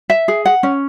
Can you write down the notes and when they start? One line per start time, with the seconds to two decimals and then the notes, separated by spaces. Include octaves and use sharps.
0.10 E5
0.28 G#4
0.45 F#5
0.63 C#4